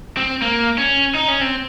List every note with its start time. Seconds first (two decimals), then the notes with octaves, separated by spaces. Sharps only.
0.17 C4
0.42 A#3
0.78 C#4
1.15 D#4
1.28 C#4
1.41 C4